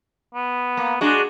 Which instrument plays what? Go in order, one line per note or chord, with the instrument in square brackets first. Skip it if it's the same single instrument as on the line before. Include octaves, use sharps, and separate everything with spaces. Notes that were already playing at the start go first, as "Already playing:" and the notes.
[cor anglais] B3
[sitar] A#3
[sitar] G#3 D4 [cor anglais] F#4